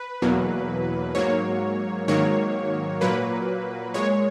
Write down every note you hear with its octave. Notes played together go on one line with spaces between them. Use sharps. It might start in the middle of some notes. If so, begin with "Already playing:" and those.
Already playing: B4
E2 B2 F#3 A#3
G#2 F#3 A#3 C#5
G#2 D#3 F#3 A#3 C#5
A#2 F#3 A#3 B4
A#2 G#3 C#5